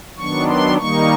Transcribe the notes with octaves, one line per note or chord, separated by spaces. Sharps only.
D#3 F#3 B3 D4 C#6
C6
D#3 G3 A#3 D#4 C#6